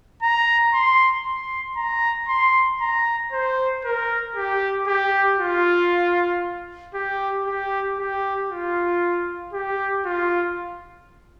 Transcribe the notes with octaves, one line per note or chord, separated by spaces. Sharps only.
A#5
C6
C6
A#5
C6
A#5
C5
A#4
G4
G4
F4
G4
G4
G4
F4
G4
F4